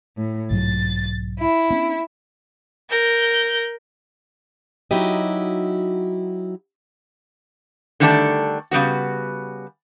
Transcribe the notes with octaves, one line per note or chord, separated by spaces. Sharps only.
A2
B1 G#2 F#3 A6
E4
B3 C#4 D4
A#4 G6
F#3 D#4 E4 F#4 G4 D#5
D3 D#3 G3 A3 D4 A4
C#3 G3 B3 F#4